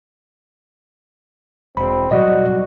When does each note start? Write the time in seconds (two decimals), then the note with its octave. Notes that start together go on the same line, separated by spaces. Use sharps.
1.77 E1 C4 B5
2.11 B2 F#3 G3 F#4 D5 D#5